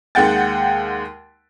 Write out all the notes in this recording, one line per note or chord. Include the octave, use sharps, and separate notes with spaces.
D#2 G#3 F#5 G5 A6